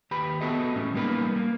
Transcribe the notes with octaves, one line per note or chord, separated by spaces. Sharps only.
D#2 G4 B4 B5
B3 F#4 G#4 A4 D#5 E5
A2 C#4
G3 A#3 B3 D#4 A#4 B4
A#3